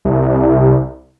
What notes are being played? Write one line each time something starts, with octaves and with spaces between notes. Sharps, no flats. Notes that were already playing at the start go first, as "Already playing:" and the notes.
C2